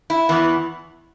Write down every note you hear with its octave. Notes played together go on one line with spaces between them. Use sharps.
E4
E2 E3 B3